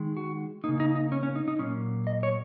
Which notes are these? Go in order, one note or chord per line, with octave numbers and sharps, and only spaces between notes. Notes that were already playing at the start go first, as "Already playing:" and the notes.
Already playing: D#3 G#3
F#4
C#3 A#3 D#4
D#4
D#4
C#4
C#4
D#4
D#4
A#2 F#3 A#3 C#4
D#5
C#5